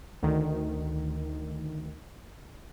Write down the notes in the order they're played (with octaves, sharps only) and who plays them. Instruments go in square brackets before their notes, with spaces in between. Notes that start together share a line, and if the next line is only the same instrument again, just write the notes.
[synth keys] D2 D#3